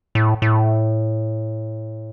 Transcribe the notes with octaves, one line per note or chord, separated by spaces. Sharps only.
A2
A2